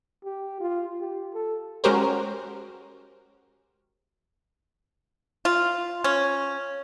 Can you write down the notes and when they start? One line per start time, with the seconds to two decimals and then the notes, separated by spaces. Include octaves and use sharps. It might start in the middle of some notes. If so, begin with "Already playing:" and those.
0.25 G4
0.60 F4
1.01 G4
1.34 A4
1.84 G#3 C#4 F#4 G4 A#4 C5
5.45 F4
6.04 C#4